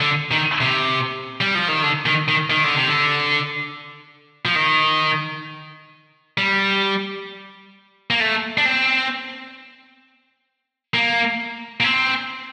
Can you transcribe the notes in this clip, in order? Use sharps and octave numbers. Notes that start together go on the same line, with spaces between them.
D3
D#3
C3
G3
F3
D#3
D3
D#3
D#3
D#3
D3
C3
D3
F3
D#3
G3
A#3
A3
D4
C4
A#3
A#3
C4